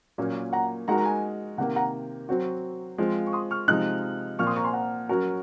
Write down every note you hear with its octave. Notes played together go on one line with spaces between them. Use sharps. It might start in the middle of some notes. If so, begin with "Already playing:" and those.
A#2 F#3 A#3 C#4
F#5 A#5
G#3 D#4 F#4 A#4 F#5 A#5
A#5
G#5
C3 D#3 A#3 F#5
F#5 A#5
F#3 C4 F#4
F3 G#3 C4 F4
C#6
C6 D#6
C#6 F6
C3 F3 G#3 D#4 D#6 F#6
A#2 F3 C4 C#6 F6
C6 D#6
A#5 C#6
G#5 C6
F#5 A#5
F#3 C#4 F#4 A#4